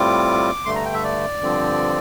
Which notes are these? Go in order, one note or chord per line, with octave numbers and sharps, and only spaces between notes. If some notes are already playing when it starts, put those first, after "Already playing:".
Already playing: A2 G3 C4 F4 D6
G2 D3 A3 C6
A#5
G5
E5
D5
G2 D3 F3 C4